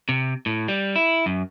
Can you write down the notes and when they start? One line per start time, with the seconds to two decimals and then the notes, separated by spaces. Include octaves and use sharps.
0.09 C3
0.46 A2
0.68 G3
0.96 E4
1.26 F#2